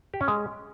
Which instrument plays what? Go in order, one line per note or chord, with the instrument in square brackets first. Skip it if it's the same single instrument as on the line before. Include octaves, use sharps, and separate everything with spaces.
[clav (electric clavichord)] G4
C#4
G#3